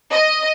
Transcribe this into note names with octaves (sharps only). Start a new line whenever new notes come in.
D#5